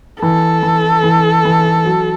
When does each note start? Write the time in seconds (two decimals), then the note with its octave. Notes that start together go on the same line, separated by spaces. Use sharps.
0.22 E3 A4
0.63 E3
1.03 E3
1.45 E3
1.85 F#3